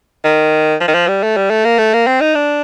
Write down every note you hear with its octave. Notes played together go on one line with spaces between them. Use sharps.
D#3
F3
D#3
F3
G3
A3
G3
A3
A#3
A3
A#3
C4
D#4
D4